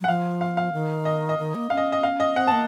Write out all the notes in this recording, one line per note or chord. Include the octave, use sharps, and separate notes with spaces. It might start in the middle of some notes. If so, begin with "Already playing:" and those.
F#3
F#5
F3 F5
F5
F5
D#3
D#5
D#5
D#3
A#3
C#4 F5
D#5
D#5
F5
D#5
C4 F#5
A#3 A5